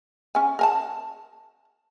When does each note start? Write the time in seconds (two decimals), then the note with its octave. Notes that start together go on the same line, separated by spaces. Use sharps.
0.35 C#4 G#5
0.59 A#4 G#5 A5